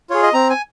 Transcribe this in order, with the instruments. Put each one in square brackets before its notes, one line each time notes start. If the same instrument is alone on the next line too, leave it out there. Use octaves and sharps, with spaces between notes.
[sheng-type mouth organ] F4 G#4 C#5
D#5
C4 A#5
G#5